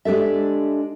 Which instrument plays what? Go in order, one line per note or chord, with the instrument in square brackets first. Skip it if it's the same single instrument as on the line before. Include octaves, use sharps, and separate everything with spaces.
[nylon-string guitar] G#3 D4 G4 A4 E5